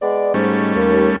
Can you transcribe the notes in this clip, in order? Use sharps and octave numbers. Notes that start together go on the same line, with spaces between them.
G#3 B3 D5
G#2 G3 A3 C#4
D#2